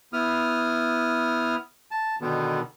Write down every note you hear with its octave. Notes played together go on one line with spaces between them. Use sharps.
B3 E4 D#6 F6
A5
B2 D3 D#3 B3